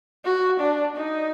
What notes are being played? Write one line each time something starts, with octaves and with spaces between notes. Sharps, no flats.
F#4
D4
D#4